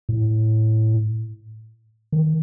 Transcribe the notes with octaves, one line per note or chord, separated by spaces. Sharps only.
A2
D#3